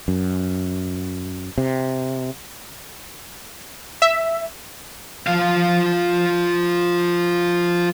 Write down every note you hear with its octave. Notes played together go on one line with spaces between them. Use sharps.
F#2
C3
E5
F3 F5